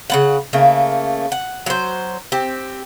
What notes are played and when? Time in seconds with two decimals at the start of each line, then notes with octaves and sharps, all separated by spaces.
0.10 C#3 B3 F#5
0.53 C#3 A3 A#3
1.32 F#5
1.66 F#3 C5
2.32 C4 G4